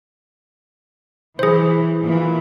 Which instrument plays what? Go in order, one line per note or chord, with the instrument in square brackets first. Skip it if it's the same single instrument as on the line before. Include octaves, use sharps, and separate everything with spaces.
[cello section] E3 [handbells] G#4 C5
[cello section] A#2 E3